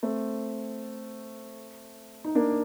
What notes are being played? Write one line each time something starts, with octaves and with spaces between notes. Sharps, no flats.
A3 C4
D#4
A#3 D4